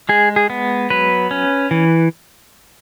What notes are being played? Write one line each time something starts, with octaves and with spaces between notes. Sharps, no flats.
G#3 G#4
G#4
B3
F#3 B4
C#4
E3